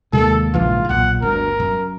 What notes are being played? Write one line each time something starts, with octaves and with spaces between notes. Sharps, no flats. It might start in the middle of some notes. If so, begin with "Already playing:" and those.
D#2 C3 D#3 G#3 A#3 A4
A#1 E2 G#2 C#3 E3 F4
B1 E2 A#2 F#5
G1 D2 G2 A#4
F#2